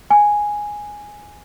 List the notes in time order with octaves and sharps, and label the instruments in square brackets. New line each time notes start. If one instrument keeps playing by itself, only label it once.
[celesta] G#5